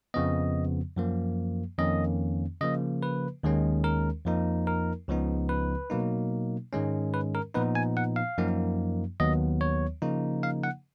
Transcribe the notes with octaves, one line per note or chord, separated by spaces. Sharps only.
F2 C#3 F3 B3 D#5
F#2 F3 A#3
F2 D#3 A#3 C#4 D#5
C#3 F3 A#3 D#5
B4
D#2 D#3 G#3 C#4
A#4
F2 F3 A#3 D#4
A#4
C#2 C#3 F3 B3 D#4
B4
B2 F#3 A#3 D#4
G#2 D#3 G#3 C#4
B4
A#4
A#2 F3 B3 D#4 B4
G#5
F#5
F5
F#2 F3 A#3 D#4
D#2 D#3 F#3 B3 D#5
C#5
C#3 F3 A#3 D#4
F5
F#5